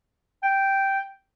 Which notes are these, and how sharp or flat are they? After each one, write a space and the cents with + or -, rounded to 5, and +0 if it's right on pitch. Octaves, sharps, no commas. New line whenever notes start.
G5 -5